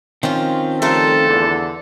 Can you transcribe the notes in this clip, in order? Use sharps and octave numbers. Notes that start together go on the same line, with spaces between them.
D#3 F3 C4 C#4 F4
C#3 F3 G3 A3 F4 A4 A#4
E2 D3